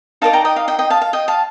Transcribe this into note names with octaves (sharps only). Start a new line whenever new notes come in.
D#4 A#4 D5 F5 A5
G5 A#5
D#5 G5
F5
D#5 G5
D#5 G5
F5 A5
F5
D#5 G5
F5 A5